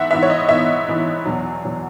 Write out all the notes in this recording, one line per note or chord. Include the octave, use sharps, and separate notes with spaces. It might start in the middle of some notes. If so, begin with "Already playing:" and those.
Already playing: G#2 E3 B3 E5 F#5
G#2 E3 B3 E5
C#5
D#5
G#2 E3 B3 E5
G#2 E3 B3
E2 B2 F#3
E2 B2 F#3